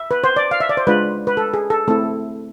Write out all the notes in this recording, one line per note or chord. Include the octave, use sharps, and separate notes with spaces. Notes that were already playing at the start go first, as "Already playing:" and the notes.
Already playing: E5
B4
C5
D5
F5
E5
D5
C5
G#3 D4 F4 B4
B4
A4
G#4
A4
A3 C4 E4 A4